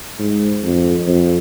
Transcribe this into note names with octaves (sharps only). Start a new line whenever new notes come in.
G#2
F2
F2